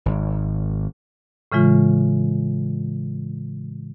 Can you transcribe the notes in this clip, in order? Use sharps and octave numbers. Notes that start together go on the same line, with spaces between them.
G#1
A2 C#3 E3 G#3 F4